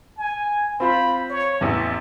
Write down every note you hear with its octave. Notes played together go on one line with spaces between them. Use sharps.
G#5
C4 F4 C5 B5
C#5
A1 E2 E5